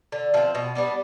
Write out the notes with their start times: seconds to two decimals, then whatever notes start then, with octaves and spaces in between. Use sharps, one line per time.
0.12 D3
0.34 F3 A3
0.37 C4
0.55 B2
0.75 G3 B3 D4